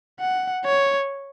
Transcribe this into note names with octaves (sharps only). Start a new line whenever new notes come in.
F#5
C#5